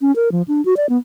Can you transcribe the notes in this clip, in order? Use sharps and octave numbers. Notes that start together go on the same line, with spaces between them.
C#4
A#4
F3
D4
F#4
D5
B3